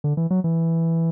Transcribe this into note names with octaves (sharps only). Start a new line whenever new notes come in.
D3
E3
F#3
E3